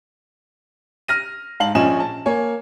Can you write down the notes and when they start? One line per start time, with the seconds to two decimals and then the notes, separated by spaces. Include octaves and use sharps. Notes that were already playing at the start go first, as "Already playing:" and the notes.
1.08 F6 A#6 D#7
1.60 G#2 F5 A5 F#7
1.75 A#1 F3 C#4 D#5 G#5 E7
2.00 A5
2.26 A#3 C#5 G#5